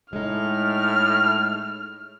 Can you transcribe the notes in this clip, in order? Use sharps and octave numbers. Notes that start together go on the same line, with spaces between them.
A2 G#3 D#4 F6